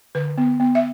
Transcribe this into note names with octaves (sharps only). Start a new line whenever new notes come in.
D3 B4
B3
B3
E5